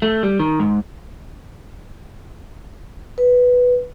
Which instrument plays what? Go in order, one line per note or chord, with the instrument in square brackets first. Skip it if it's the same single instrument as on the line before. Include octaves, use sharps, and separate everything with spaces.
[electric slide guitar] A3
G3
D#3
G#2
[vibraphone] B4